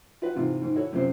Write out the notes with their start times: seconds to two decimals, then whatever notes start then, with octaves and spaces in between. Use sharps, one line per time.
0.22 F4 F#4 B4 F#5
0.35 G#2 C3 E3 F4
0.62 G#2 D#3
0.75 E4 F#4 A4 C#5
0.92 F#2 C3 F4 C5